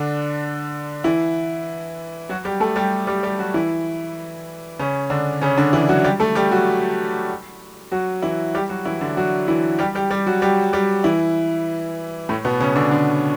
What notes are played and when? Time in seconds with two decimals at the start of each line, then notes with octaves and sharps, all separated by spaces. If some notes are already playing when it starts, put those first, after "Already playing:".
Already playing: D3 D4
1.04 E3 E4
2.29 F#3 F#4
2.45 G3 G4
2.60 A3 A4
2.76 G3 G4
3.07 G3 G4
3.23 G3 G4
3.39 F#3 F#4
3.54 E3 E4
4.79 C#3 C#4
5.10 D3 D4
5.41 C#3 C#4
5.57 D3 D4
5.73 E3 E4
5.89 F#3 F#4
6.04 G3 G4
6.20 A3 A4
6.35 G3 G4
6.51 F#3 F#4
7.92 F#3 F#4
8.22 E3 E4
8.54 G3 G4
8.69 F#3 F#4
8.85 E3 E4
9.01 D3 D4
9.17 F#3 F#4
9.48 E3 E4
9.79 G3 G4
9.95 G3 G4
10.10 G3 G4
10.26 F#3 F#4
10.42 G3 G4
10.73 G3 G4
11.04 E3 E4
12.29 A2 A3
12.45 B2 B3
12.60 C#3 C#4
12.76 D3 D4
12.91 D3 D4